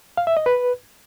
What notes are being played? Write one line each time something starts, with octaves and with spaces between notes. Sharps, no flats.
F5
E5
D#5
B4